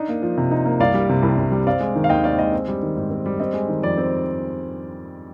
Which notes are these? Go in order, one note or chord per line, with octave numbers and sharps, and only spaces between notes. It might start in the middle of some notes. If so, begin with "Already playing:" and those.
Already playing: D4 D#4 D#5
A#3
F3
C3
D#4
A#3
C2 D5 F5
G3
C3
C2
C2
G3
C4 D5 F5
G#3
D#3
F5
D#2 D#5 G5
C4 D5 F5
G#3 D#5
C4
G3
D#3
G#2
C4
G3
C4 D#5
G#3
D#3
F2 D5
C4